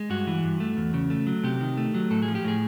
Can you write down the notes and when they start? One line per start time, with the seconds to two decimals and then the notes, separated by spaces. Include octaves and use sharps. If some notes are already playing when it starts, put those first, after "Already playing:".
Already playing: G#3
0.10 G2 F#4
0.27 E3
0.44 G2
0.60 A3
0.77 E2
0.94 C#3
1.10 A3
1.27 F#3
1.44 C3 G4
1.61 D#3
1.77 A3
1.95 F#3
2.10 A2 A4
2.22 G#4
2.28 F3
2.35 G4
2.44 A2 G#4